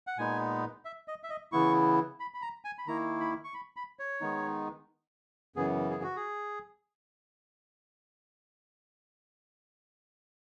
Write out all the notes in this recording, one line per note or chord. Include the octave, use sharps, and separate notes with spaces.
F#5
A#2 G#3 B3 D#4 G#5
E5
D#5
E5
D#5
C#3 E3 B3 E4 C#6
B5
B5
A#5
G#5
B5
D#3 A#3 E4 A#5
B5
C#6
B5
B5
C#5
D#3 G#3 B3 D#4
F#2 C#3 E3 B3 G#4
G#4
F#4
G#4